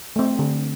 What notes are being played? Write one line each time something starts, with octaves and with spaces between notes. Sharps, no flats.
A3 C4
D3